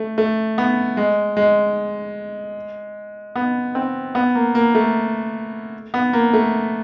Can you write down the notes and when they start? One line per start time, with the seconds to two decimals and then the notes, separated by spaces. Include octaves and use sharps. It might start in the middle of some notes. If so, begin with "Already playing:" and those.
Already playing: A3
0.18 A3
0.58 B3
0.97 G#3
1.37 G#3
3.36 B3
3.75 C4
4.15 B3
4.35 A#3
4.55 A#3
4.75 A3
5.94 B3
6.13 A#3
6.33 A3